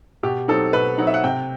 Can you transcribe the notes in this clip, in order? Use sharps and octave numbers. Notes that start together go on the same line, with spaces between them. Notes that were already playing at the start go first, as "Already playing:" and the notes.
B2 G4
F#3 C4 D#4 A4
B2 B4
F#3 C4 D#4 F#5
E5
F#5
C3 G5